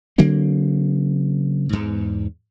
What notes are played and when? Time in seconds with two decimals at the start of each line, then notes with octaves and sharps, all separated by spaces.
0.18 C#3 F#3 A#3 C4
1.69 E2 G#2